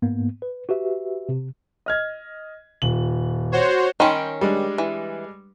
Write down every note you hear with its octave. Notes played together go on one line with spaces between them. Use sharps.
G#2 A#3 B3
B4
F#4 G4 B4 E5
C3
D#5 F6 G#6
D#1 F#7
F#4 C5 C#5
D#3 C#4 G5 B5 C6
G3 G#3 D4
E3